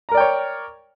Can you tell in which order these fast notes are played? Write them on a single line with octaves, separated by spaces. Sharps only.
A#5 A#4 D5 G5 C#5